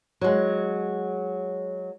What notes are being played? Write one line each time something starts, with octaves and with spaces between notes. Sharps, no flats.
F#3 G#3